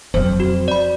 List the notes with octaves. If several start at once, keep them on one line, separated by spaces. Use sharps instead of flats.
F2 F#3 C5
F#4
D5 B5